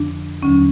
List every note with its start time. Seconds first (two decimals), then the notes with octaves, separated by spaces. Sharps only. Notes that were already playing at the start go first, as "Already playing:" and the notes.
Already playing: F2 D3 F3 D4
0.42 D#2 D3 F#3 C#4